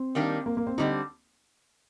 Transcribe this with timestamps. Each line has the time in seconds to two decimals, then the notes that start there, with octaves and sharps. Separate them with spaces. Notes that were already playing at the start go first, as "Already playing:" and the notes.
Already playing: C4
0.15 D#3 G3 A#3 D4
0.46 A#3
0.57 A#3
0.67 C4
0.78 D3 G3 C4 D#4